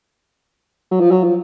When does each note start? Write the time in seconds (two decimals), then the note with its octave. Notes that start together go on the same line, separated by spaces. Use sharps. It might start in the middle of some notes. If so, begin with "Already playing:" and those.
0.91 F#3
1.00 F3
1.11 F#3
1.24 F3